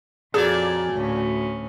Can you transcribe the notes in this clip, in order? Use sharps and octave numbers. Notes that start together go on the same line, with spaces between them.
F2 A#2 F#4 G#4 A4 C#5 D5
D2 A2 C#4